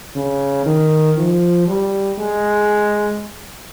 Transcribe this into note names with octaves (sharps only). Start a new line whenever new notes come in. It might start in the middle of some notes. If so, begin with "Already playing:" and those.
C#3
D#3
F3
G3
G#3